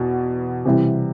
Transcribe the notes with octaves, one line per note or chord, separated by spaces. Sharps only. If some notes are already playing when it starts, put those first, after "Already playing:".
Already playing: E2 B2
C3 E3 G3